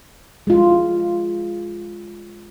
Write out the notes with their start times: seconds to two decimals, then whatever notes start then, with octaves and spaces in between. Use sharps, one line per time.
0.47 G#3 F4